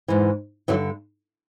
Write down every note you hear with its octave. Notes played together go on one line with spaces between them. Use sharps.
G#2 E3
G2 D3 E3 F#3